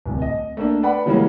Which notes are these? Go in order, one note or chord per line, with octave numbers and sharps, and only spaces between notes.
D1 C2
D#5
A3 A#3 D4
B4 D5 F#5 B5
C#3 E3 G3 G#3 A#3 C#4